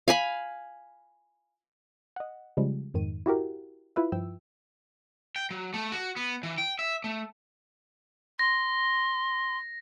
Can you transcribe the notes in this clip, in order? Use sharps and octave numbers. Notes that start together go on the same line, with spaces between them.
F5 G#5 B5
D#5 F#5
C#3 F3 G3 G#3
F2 G#2 D#3 D#7
E4 F#4 G4 A#4
E4 F4 B4 E5
G2 F3 G5 E6
G5
F#3
A3
F#4
B3
E3
G5
E5
A3
C6 A#6